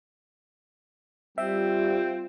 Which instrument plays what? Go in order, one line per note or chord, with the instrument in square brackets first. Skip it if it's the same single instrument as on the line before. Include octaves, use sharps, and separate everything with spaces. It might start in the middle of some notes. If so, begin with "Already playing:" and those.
[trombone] G3 [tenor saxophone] C4 [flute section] F4 [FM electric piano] E5